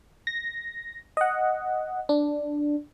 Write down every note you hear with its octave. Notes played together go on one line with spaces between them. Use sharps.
A#6
D#5 F#5
D4